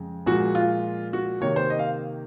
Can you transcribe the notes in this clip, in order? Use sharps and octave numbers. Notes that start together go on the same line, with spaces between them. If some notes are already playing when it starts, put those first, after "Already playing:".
Already playing: F2 C#3 G#3
A#2 F3 G#3 F#4
F4
F#4
C3 D#3 A#3 C#5
C5
D#5
F5